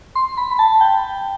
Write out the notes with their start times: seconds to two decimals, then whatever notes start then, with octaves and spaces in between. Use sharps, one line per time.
0.15 C6
0.37 B5
0.51 B5
0.59 A5
0.81 G5